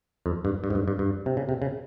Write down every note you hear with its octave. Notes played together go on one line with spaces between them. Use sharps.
F2
G2
G2
G#2
G2
G2
G2
C3
C#3
C3
C#3